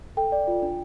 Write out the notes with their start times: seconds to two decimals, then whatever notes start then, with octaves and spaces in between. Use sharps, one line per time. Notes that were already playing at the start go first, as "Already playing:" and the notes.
0.17 A4 G5
0.32 D5
0.47 F4
0.62 D4